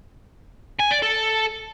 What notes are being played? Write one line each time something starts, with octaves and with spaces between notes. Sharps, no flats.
G#5
D5
A4